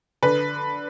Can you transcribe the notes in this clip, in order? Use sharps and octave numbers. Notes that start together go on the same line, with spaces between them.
D3 B4